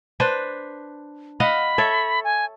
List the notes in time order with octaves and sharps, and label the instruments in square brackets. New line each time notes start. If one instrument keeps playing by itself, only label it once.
[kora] D4 B4 C5
[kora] D#5 F5 F#5 [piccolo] B5
[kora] A4 C#5 E5
[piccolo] G#5